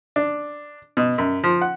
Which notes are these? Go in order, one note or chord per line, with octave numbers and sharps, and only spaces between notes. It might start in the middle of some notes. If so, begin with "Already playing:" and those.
D4
B2
F#2
F3
F#5